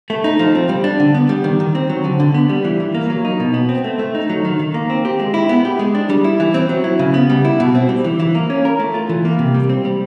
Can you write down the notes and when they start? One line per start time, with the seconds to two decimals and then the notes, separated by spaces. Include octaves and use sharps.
0.10 A3
0.24 D#4
0.39 F3
0.55 C4
0.69 G3
0.84 D4
1.00 D3
1.14 B3
1.29 G3
1.44 D#3
1.60 D#3
1.75 C4
1.90 F#3
2.04 D3
2.20 D3
2.34 B3
2.49 G3
2.65 E3
2.80 E3
2.95 A#3
3.10 F#3
3.25 D#4
3.40 B2
3.54 B3
3.69 C4
3.84 A3
3.99 A3
4.15 D#4
4.30 F#3
4.45 D#3
4.59 D#3
4.74 A#3
4.90 C4
5.05 G4
5.20 G#3
5.34 E4
5.49 B3
5.65 G4
5.79 G#3
5.95 D4
6.10 G3
6.24 E4
6.40 E3
6.54 C4
6.69 F#3
6.84 E4
6.99 C#3
7.14 B3
7.30 G3
7.45 E4
7.60 B2
7.75 C4
7.89 G3
8.04 E3
8.20 E3
8.35 A#3
8.50 C#4
8.65 A#4
8.80 A3
8.94 F4
9.09 E3
9.25 A#3
9.39 C3
9.54 G3
9.69 C4
9.85 G3